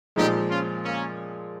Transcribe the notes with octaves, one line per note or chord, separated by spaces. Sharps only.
A#2 F3 G#3 D#4 G4
C#4 F4
A#3 C#4